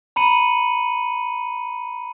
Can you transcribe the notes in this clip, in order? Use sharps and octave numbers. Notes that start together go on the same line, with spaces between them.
A#5 B5 C#7 D#7 F#7